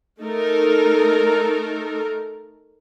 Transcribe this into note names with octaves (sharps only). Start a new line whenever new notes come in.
A3 D#4 A4 A#4